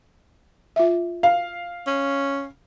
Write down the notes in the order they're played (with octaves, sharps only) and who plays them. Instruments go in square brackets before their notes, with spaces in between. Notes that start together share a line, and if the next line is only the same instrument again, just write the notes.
[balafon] F4 E5
[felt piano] F5
[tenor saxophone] C#4